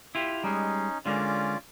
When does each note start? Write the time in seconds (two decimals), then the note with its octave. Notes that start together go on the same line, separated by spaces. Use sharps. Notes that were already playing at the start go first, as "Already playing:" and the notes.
0.15 E4 F4 G4
0.44 G3 G#3 C#4 D#4
1.06 D3 G#3 C#4 F4 A#4 D5